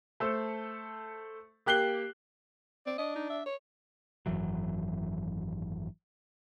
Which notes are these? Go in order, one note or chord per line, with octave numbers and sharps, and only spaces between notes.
A3 A4 C5
A#3 G4 F#6 C7 G7
C4 D5
D4 D#5
D#4
E5
C#5
G#1 F#2 E3 F#3